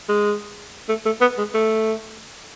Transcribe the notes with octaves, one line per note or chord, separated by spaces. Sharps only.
G#3
A3
A3
B3
G#3
A3